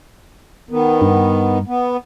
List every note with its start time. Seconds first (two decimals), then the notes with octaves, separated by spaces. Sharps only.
0.71 D#3 B3
1.01 G2
1.67 B3